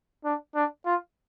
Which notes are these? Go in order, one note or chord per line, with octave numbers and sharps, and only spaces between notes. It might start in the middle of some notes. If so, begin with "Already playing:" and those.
D4
D4
F4